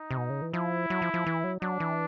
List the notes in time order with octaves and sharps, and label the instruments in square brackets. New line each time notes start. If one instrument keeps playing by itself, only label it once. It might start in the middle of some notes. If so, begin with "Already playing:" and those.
Already playing: [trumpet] D#4
[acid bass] C3
B2
C#3
E3
[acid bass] F3 [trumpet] E4
[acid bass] F#3
F3
F3
E3
F#3
[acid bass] F#3 [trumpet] D4
[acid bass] E3